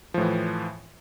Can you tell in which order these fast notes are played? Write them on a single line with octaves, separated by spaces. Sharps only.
F3 A2 E3